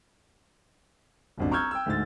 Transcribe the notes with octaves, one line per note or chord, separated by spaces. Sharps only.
D#1 G#1 D4
A#5 C#6 E6 F6 G6 G#6
G5 E6
D2 G#2 A6